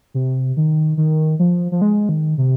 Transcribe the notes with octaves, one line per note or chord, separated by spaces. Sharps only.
C3
D#3
D#3
F3
F3
G#3
D#3
C3